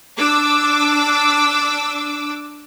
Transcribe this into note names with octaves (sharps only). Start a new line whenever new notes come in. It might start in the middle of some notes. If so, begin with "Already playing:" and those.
D4 D6 E6